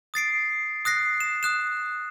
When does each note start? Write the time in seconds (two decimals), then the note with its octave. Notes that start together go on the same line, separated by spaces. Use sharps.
0.14 D#6 A6 C7 D7
0.85 D#6 F#6 A#6 C7
1.20 E7
1.43 D#6 F#6 E7